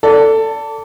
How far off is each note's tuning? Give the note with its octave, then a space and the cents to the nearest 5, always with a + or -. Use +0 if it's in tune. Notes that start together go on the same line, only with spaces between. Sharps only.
A4 +15 D5 -25